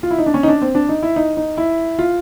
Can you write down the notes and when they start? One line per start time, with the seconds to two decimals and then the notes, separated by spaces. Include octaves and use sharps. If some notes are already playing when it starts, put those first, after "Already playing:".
0.03 F4
0.11 E4
0.18 D#4
0.26 D4
0.34 C#4
0.43 D#4
0.48 D4
0.62 C4
0.75 D4
0.89 D#4
1.03 E4
1.16 D#4
1.37 D#4
1.57 E4
1.99 F4